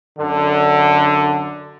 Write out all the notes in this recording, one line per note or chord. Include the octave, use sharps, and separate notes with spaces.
F#2 D3